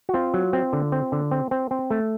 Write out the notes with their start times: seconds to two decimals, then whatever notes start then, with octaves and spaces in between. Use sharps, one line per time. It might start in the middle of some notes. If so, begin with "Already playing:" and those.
0.09 F#4
0.14 C4 F4
0.34 F#3
0.53 C4
0.73 D3
0.92 C4
1.12 D3
1.31 C4
1.51 C4
1.71 C4
1.90 A3